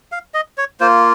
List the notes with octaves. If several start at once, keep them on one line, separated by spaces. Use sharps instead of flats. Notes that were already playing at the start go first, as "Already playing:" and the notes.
F5
D#5
C#5
A#3 F4 C5